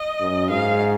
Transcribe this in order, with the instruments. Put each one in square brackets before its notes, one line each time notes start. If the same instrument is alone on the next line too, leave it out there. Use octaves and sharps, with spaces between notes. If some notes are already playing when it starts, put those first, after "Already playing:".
Already playing: [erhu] D#5
[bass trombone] F#2
[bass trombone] G#2 [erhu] F5